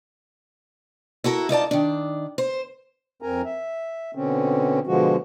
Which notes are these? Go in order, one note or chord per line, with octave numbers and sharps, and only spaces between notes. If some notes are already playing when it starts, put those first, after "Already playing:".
E4 F#4 A4 A#4
D#4 F4 D5 A5
D#3 D4
C5
F2 C4 A#4 G#5 A#5
E5
B2 D3 C4 C#4
B2 D3 F3 G#3 F#4